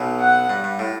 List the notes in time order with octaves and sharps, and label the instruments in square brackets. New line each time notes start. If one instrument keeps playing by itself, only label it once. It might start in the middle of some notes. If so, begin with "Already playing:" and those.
Already playing: [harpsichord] B1 B2
[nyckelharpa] F#5
[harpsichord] G2
G2
A2